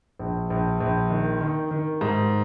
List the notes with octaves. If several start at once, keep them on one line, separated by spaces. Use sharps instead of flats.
A#1
A#1
A#1
D#3
D#3
D#3
G#2